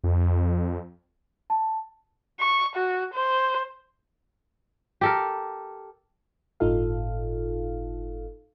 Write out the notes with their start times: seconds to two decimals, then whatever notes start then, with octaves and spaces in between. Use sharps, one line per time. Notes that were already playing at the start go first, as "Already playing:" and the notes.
0.04 F2
1.50 A5
2.40 C#6
2.75 F#4
3.13 C5
5.01 G4 A4 A#4
6.60 G1 A2 D#4 F4 A4 F5